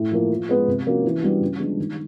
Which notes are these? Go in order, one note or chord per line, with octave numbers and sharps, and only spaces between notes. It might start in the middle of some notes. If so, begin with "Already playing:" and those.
Already playing: A2
F3 A#3
F3
G#3 B3
C3
F3 A#3 C#4 F#4
E3
G3 B3 D4 F#4
C#3
F3 G#3 B3 D4
D#3